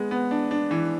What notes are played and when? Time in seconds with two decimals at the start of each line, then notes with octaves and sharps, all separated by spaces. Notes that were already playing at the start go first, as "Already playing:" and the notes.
Already playing: G#3 B3
0.11 B3
0.31 D4
0.51 D4
0.71 E3